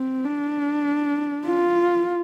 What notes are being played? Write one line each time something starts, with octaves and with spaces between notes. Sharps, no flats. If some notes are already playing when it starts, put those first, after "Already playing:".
Already playing: C4
D4
F4